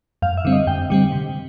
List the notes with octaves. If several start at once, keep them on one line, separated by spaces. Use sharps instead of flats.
F#2 F5
E5
D3 G3 C4
D#5
F#2 G5
D3 G3 C4
C3